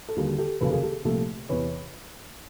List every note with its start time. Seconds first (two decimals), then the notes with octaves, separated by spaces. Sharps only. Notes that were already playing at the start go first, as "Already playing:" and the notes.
0.09 A4
0.17 D#2 D3 G3 A#3 F#4 G#4
0.38 G4 A4
0.61 F1 D#2 C#3 F#3 A#3 A4 B4
0.71 G#4 A#4
0.83 G4 A4
1.05 C2 A#2 F3 A3 G4 A4
1.49 E2 C3 E3 B4 C#5